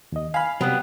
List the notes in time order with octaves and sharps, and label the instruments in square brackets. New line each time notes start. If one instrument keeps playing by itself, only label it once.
[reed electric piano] D#2 D#5
[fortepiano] F5 B5 [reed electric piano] G#5 F6
[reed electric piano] C3 [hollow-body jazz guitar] F#3 G3 [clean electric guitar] B3